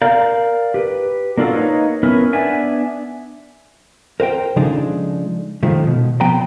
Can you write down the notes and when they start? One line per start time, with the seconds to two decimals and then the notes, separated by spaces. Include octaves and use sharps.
0.02 A#4 D5 F5 A#5 G6
0.74 G4 B4
1.38 A#3 D4 F4 F#4 A4
1.53 A#3 D#4 B4 C#5 D#5
2.03 B3 C#4 E4 A#4 B4
2.33 B3 D4 E5 G#5
4.20 A#4 C5 F5 G5
4.56 C#3 F3 G#3 D4 D#4 A4
5.63 F#2 D#3 F3 G#3 A3
5.87 B2
6.20 F3 B3 G5 A#5